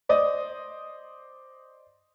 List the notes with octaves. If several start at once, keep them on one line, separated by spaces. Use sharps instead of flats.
C5 D5 D#5 D#6